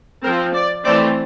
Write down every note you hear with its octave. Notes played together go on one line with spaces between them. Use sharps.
F3 C4 A#4
D5
E3 A3 C4 D5